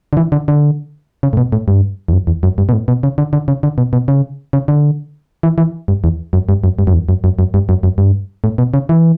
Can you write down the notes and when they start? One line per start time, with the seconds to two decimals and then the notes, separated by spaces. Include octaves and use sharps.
0.13 D3
0.17 E3
0.32 D3
0.48 D3
1.23 C#3
1.33 A2
1.37 B2
1.52 A2
1.68 G2
2.08 E2
2.13 F#2
2.27 E2
2.43 F#2
2.58 G2
2.69 B2
2.73 A2
2.88 B2
3.03 C#3
3.18 D3
3.33 D3
3.48 C#3
3.63 D3
3.78 B2
3.93 B2
4.08 C#3
4.53 C#3
4.68 D3
5.43 E3
5.58 E3
5.88 G2
6.04 E2
6.33 F#2
6.49 G2
6.64 F#2
6.79 G2
6.87 F#2
6.93 E2
7.09 F#2
7.24 F#2
7.39 F#2
7.54 G2
7.69 F#2
7.83 F#2
7.98 G2
8.44 A2
8.58 B2
8.74 C#3
8.89 E3